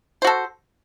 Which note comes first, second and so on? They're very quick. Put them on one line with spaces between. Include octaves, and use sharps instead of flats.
C5 F#4 A4